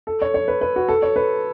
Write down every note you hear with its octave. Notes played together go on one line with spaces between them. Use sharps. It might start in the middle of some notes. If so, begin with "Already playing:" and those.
A4
C#5
C#5
B4
B4
F#4
A4
C#5
B4